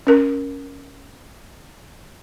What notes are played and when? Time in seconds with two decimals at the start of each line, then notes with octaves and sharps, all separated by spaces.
0.07 C#4 A#4